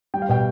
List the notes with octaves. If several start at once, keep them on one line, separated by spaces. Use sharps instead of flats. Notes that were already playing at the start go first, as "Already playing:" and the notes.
G3 G5
F5
B2 G5